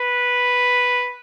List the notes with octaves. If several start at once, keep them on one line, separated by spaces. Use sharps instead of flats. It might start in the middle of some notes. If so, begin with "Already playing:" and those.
Already playing: B4